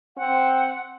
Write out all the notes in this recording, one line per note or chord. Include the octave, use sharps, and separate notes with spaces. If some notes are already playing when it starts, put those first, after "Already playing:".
C4 F#5